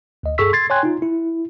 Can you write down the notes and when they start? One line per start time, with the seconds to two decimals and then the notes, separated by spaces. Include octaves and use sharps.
0.23 D2 D#5
0.38 G2 G#4 A4 C#6 E6 B6
0.53 C6 G#6 A6 C7
0.70 C#5 G5 G#5 C6 F#6 G#6
0.83 D#4 F4
1.02 E4